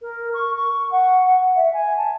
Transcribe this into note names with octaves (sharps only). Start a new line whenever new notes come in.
A#4
C#6
C#6
F#5
E5
G#5
A5